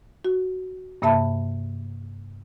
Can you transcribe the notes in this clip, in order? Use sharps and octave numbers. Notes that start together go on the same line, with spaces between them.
F#4
G2 C3 A#3 E5 A5 B5